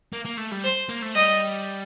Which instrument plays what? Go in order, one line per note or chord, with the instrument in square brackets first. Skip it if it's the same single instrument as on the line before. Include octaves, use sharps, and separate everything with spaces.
[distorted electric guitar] A#3
A#3
A3
G3
[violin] C5
[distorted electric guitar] A#3
A3
[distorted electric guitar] G3 [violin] D#5